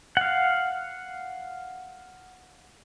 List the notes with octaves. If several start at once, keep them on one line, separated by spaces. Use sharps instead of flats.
F5 F#5